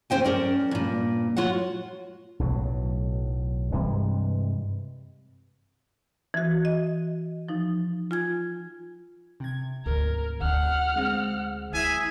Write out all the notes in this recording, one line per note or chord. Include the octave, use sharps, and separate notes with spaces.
C#4 C5 G5 G#5
C#4 A#4 D5
G2 A#2
F4 F#4 C#5 F#5
B1 A2 F#3
G2 C3 E3 G#3
E3 F#4
D#5
F3 D#4
F4 G#5 G#6
C3 G#6
D2 G#2 A#4
D2 F#5 F6
G#3 C4
D2 E4 G#4 E5 G#5